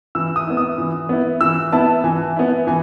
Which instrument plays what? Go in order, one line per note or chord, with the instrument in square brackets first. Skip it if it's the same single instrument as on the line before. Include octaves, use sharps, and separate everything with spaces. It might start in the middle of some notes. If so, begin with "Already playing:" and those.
[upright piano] E3 [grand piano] E6
[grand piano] D#6
[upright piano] B3 E4
[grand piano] D#6
[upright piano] E3
B3 E4
[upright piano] E3 [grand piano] E6
[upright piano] B3 E4 [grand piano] A5
[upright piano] E3 [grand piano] G#5
[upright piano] B3 E4
[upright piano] E3 [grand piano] G#5